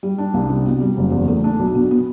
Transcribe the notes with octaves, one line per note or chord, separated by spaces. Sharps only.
G3
D4
C2
C3
B2
G3
F#1
E2
A3
D4
B1
B2
B3